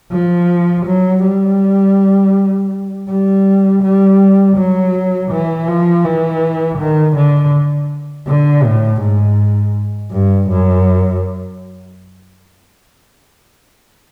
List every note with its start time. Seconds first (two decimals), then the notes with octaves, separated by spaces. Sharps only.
0.11 F3
0.86 F#3
1.24 G3
3.09 G3
3.83 G3
4.56 F#3
5.31 E3
5.68 F3
6.04 E3
6.78 D#3
7.16 D3
8.27 D3
8.64 A2
9.01 G#2
10.11 G2
10.49 F#2